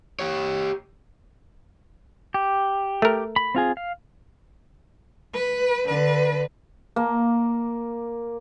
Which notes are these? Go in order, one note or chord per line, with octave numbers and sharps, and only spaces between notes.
G4 C#5
G4
A3 A#4
B5
C4 F4 G#4
F5
B4
D3 B4
A#3